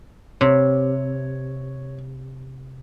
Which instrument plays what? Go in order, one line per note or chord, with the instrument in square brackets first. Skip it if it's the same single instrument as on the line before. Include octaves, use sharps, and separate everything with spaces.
[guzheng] C3 [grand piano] C#5